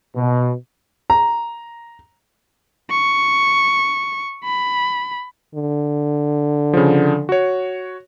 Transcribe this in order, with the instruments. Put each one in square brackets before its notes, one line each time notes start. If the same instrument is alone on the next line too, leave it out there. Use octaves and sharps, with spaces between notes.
[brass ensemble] B2
[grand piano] A#5
[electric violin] C#6
B5
[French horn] D3
[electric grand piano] C#3 F3
F#4 C#5